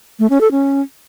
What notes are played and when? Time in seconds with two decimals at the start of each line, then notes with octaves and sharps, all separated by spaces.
0.19 A3
0.30 C#4
0.41 A4
0.51 C#4